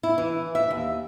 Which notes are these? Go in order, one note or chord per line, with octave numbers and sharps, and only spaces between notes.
E4
E3
E5
D#2